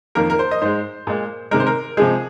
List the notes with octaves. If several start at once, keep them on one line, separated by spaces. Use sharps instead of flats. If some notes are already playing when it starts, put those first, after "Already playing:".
F2 D#3 A#3 A#4
A#4
C5
D#5
G#2 G#3 C5
A#2 G#3
C3 D#3 G#3 A#4
C5
A#4
C3 F3 G#3 G#4